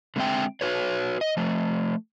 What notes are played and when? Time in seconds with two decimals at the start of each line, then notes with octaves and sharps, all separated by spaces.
0.16 D3 G#3 C4 E5 G5
0.61 F#4 B4 C#5
1.21 D#5
1.37 F3 A3